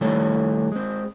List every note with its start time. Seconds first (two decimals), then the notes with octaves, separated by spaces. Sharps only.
0.01 D#3 G3 A3 E4 A4 C#5
0.72 G#3 C4